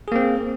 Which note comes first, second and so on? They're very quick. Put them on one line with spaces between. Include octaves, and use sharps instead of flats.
G#4 A#3 C4